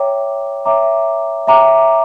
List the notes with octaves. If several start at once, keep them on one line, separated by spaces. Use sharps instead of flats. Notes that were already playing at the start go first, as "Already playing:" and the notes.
Already playing: C#5 E5 G5 A#5 D6
C#5 E5 G5 A#5 D6
C#5 E5 G5 A#5 D6